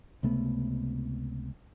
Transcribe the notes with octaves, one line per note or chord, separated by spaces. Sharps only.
C#2 C3 A3 B3